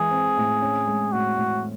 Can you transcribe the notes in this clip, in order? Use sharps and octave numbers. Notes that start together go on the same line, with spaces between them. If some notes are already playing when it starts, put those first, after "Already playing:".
Already playing: E3 G#3 G#4
C4
A2
C#4
G#3
A2 F#4
A2